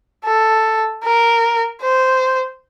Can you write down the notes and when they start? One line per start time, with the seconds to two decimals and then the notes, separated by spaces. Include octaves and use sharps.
0.25 A4
1.04 A#4
1.82 C5